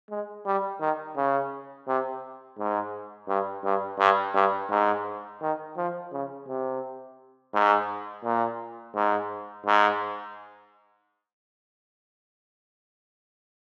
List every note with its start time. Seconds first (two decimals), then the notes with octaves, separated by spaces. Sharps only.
0.10 G#3
0.46 G3
0.80 D#3
1.17 C#3
1.87 C3
2.58 G#2
3.28 G2
3.64 G2
3.99 G2
4.35 G2
4.70 G#2
5.42 D#3
5.77 F3
6.12 C#3
6.48 C3
7.54 G#2
8.24 A#2
8.95 G#2
9.67 G#2